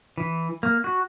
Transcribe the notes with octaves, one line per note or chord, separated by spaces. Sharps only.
E3
A#3
F#4